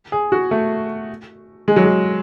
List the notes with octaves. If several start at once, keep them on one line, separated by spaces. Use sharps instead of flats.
G#4
F#4
A3
G#3
F#3
G#3